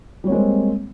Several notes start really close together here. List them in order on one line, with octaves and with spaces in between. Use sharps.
G3 C#5 A#3 G#3 C4